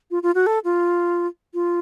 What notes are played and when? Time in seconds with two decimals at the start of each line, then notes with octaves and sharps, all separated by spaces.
0.11 F4
0.23 F4
0.35 F#4
0.47 A4
0.64 F4
1.54 F4